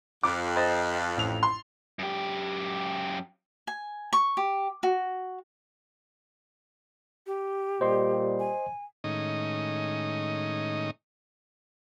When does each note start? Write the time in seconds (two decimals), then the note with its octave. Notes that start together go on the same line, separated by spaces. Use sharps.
0.23 F2 D6
0.56 C5 D#5 A6
1.17 A1 F7
1.43 C6
1.99 F#2 G4
3.67 G#5
4.13 C#6
4.37 G4
4.83 F#4
7.27 G4
7.81 A#2 G3 C5 D#5 C6
8.39 G#5
9.04 A2 D#3 G#3 C#4 D#4 D#5